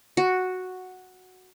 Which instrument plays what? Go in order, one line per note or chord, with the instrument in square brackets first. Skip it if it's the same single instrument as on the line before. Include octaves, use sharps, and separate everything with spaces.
[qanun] F#4